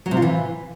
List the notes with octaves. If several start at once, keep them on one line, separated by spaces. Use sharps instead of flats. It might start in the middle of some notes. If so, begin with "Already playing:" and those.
F#3
C3
F4
E3